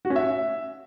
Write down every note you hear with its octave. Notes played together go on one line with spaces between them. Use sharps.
F#4
C#4
E5